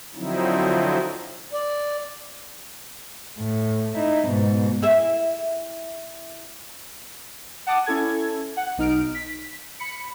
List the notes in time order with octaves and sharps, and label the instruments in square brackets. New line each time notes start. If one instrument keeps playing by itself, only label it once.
[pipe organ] D3 F3 F#3 C4 D#4 E4
[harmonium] D5
[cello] A2
D#4 E4
G#2 B2
[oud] E4 G#4 E5
[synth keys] F#5 A5 D6 D#6
C#4 E4 A4 G#6
F#5
B1 D#4 F6 D7
B6
B5 C#7